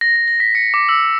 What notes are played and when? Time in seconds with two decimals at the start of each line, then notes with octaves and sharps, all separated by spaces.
0.01 A#6
0.16 A#6
0.28 A#6
0.40 B6
0.55 C#7
0.74 D6
0.89 E6
1.02 B6